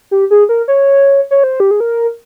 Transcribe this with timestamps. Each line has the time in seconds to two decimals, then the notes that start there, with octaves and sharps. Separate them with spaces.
0.11 G4
0.31 G#4
0.49 A#4
0.68 C#5
1.31 C#5
1.44 C5
1.60 G4
1.71 G#4
1.80 A#4